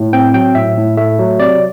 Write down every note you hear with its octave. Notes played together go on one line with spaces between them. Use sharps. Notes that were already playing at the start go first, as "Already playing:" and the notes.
Already playing: A2
C4 G5
F#3 G5
A2 E5
A2
A3 E5
F#3
C3 D5